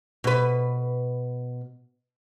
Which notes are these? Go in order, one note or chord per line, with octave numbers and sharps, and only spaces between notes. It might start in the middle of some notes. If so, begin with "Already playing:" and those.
B2 B4